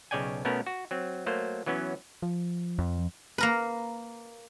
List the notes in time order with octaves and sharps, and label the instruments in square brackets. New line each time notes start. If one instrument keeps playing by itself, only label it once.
[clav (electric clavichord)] B1 C#3 C#5 D5 G5 G#5
B2 A3 B3 C#4 A#4
F#4
F#3 C4
F#3 A3 A#3 C5
E3 F#3 B3 C#4
[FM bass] F3
[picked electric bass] F2
[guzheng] A#3 A#4 B4